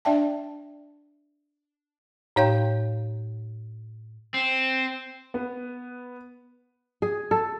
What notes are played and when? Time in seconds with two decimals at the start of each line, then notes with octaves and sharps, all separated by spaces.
0.05 D4 D5 E5 G5 A5
2.36 A2 D#4 C#5 F5 G5 G6
4.34 C4
5.34 B3
7.02 G#4
7.31 A4